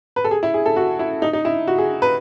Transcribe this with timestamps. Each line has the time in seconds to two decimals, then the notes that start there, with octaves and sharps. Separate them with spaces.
0.16 B4
0.24 A4
0.31 G#4
0.43 E4
0.54 G#4
0.66 A4
0.76 F#4
0.99 E4
1.22 D#4
1.33 D#4
1.45 E4
1.67 F#4
1.78 G#4
2.02 B4